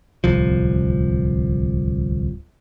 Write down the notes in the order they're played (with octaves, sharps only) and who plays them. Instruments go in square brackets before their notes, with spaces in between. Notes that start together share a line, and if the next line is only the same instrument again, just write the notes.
[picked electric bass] D1 C2 F3